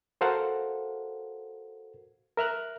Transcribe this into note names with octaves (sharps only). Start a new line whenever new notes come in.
F#4 A4 A#4 C5 F5 F#5
A#4 E5 F6 F#6